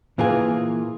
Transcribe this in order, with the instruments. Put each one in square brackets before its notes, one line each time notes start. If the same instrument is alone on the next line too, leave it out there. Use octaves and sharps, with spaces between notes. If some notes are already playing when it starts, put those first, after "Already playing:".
[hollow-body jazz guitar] A#2 E3 A#3 F4 G#4